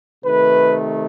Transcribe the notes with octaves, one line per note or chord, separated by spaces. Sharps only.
C3 D#3 A3 B4